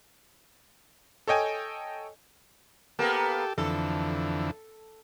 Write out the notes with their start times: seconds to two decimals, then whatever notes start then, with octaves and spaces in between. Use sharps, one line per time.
1.27 A4 C#5 D#5 G5 G#5
2.99 A#3 B3 G4 A4
3.58 F2 D3 E3 A4